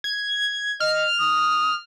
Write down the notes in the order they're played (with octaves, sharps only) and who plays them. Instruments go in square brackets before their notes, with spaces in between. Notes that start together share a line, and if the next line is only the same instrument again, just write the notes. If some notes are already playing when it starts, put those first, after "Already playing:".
[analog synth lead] G#6
[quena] D#5 [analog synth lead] F6
[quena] D#6